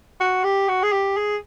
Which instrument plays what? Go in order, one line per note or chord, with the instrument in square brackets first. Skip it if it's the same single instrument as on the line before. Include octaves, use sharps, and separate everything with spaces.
[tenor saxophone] F#4
G4
F#4
G#4
G4
G#4